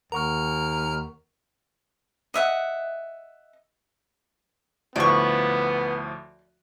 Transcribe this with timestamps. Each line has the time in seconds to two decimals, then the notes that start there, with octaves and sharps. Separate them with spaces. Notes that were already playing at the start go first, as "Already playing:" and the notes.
0.12 D#2 A#4 F#5 A#5 C#6 F6
2.34 D#5 E5 F#5
4.96 D2 A2 F3 B3 D5 C#6